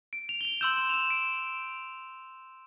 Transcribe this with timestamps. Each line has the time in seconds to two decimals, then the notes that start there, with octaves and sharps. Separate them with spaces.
0.13 D7
0.29 F7
0.41 G7
0.45 F7
0.61 C6 E6 G6 E7
0.77 E7
0.89 F7
0.94 E7
1.10 D7